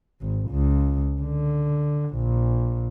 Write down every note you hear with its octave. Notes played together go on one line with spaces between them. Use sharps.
G#1
C#2
D3
A#1